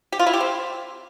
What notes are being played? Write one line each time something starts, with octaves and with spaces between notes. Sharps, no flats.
G4
F4
E4
G4
C4